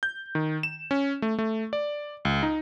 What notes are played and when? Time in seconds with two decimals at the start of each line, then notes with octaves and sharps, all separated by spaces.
0.03 G6
0.35 D#3
0.63 E7
0.91 C#4
1.22 A3
1.38 A3
1.73 D5
2.25 C#2
2.43 D#4